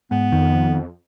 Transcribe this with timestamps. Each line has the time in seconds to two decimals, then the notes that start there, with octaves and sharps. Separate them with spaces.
0.11 G#2 B3
0.32 F2 D#3